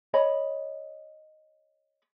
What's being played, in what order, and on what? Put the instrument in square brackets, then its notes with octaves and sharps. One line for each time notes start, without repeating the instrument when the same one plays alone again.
[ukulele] C#5 D#5 B5